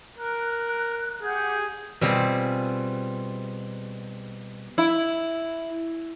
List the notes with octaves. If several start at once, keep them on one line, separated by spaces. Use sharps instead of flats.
A#4 F#6
G4 G#4 F#5 G6
B2 G3 C4 F4 G#4
E4